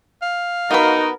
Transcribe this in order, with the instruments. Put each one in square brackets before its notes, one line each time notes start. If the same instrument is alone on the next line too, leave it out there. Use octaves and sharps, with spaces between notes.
[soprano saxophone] F5
[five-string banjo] B3 B4 [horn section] D#4 F#4 [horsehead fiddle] A#4